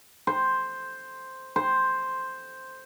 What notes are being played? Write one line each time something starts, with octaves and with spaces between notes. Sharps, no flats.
C5
C5